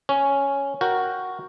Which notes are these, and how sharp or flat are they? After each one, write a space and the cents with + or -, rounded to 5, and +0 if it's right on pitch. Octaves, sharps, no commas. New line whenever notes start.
C#4 +0 C#5 +0
F#4 +0 A#4 +5 G5 +0